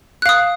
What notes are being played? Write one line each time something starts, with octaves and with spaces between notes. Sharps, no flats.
F5 D#6 F#6